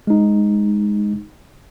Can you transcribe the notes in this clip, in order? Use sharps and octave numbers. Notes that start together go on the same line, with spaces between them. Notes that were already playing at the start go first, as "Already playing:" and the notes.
G#3 D#4